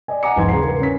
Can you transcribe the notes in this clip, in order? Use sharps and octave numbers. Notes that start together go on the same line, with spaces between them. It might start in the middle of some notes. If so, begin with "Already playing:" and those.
D5 D#5 G#5
F#5 G#5 A#5 D6 C#7
D#1 A#1 G#2 B4 C6 G#6
C#3 A#5 C7
A#4 B4
C#4 B6